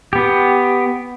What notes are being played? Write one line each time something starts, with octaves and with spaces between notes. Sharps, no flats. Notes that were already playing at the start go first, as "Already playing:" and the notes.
B3 G4